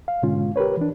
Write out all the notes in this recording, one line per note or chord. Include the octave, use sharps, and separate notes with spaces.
F5
G#2 B2 D3 G#3 C#4 F4
G4 A#4 B4 C#5
E3 D4